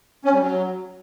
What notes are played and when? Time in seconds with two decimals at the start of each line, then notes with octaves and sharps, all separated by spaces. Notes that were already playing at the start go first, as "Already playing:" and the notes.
0.25 C#4
0.33 G3
0.41 F#3